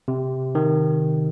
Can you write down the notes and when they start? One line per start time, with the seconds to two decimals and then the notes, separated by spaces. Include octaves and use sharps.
0.08 C3
0.55 D#3